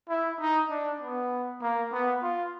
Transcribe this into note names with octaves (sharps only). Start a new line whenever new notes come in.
E4
D#4
D4
B3
A#3
B3
F4